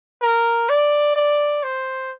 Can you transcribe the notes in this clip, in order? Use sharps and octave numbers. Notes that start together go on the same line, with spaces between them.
A#4
D5
D5
C5